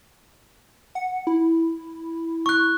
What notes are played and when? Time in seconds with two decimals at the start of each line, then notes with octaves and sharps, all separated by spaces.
0.95 F#5
1.27 E4
2.46 C#6 F#6